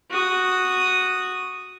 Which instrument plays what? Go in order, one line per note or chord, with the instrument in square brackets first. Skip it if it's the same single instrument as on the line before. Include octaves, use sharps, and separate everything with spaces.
[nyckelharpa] F#4 D#6